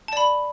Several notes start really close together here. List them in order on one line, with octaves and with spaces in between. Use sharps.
A5 D5 B5